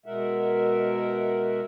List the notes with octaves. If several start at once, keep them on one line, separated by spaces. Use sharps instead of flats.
B2 G#3 A#4 E5 F#5